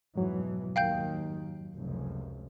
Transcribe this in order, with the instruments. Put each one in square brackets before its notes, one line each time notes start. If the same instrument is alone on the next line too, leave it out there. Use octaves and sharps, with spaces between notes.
[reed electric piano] F2 G#2 F#3 [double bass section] B2 E3
[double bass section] D#2 D#3 [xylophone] F5 G5 G6
[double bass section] F1 C#2 F#2